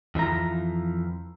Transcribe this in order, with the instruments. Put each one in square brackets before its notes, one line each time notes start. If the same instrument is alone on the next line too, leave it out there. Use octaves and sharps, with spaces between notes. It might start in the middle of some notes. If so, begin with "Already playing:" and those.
[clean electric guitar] F2 E3 F3 A#5